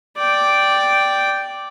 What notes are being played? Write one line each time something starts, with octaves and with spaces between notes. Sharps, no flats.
D5 G5